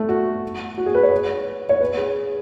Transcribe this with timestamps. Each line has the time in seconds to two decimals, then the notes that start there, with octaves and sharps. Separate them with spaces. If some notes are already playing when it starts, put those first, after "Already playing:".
Already playing: A3
0.09 F#4
0.78 F#4
0.86 G#4
0.95 B4
1.03 C#5
1.69 C#5
1.81 B4
1.97 G#4